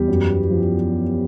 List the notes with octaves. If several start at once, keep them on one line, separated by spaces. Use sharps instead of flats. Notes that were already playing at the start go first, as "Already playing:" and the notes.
Already playing: E2 G3 G4
F#2
F3